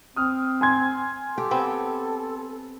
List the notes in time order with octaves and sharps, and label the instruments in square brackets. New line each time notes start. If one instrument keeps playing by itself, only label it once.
[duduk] C4 [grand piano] D#6 F6
[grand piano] G#5 C6 G#6
[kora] G4 [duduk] A4
[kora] B3 C4 G4